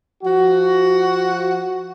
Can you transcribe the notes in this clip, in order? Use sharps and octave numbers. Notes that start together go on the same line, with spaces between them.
F3 F#4